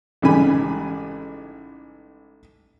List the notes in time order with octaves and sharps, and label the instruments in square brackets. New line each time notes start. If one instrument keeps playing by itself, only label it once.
[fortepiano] A1 G#2 C#3 G3 G#5 B5